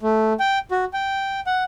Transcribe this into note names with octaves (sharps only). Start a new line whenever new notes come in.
A3
G5
F#4
G5
F#5